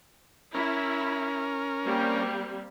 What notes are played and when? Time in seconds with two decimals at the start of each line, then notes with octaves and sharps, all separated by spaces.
0.55 C#4 E4 A#4
1.85 G3 A#3 C4